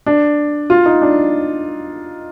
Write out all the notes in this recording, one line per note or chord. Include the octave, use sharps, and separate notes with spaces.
D4
F4
D#4
D4